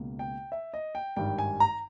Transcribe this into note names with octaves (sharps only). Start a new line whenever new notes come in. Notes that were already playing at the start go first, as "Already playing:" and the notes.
Already playing: C#2 B2 A#3
G5
E5
D#5
G5
G#1 G2 D#3 G3 G5
G#5
A#5